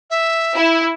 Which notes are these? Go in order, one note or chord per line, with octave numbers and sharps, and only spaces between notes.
E5
E4